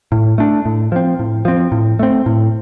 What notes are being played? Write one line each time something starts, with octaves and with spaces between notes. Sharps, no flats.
A2
A3 D4
A2
F3 C4
A2
F3 C4
A2
A3 C4
A2